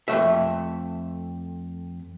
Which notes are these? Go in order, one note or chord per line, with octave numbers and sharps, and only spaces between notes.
F2 C3 A3 E5